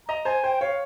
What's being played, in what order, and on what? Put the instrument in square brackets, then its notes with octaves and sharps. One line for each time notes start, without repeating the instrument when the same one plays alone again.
[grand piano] D#5 [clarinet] A#5
[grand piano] C5 [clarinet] G#5
[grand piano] C5 [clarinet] G5
[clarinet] G5
[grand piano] C#5 [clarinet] F5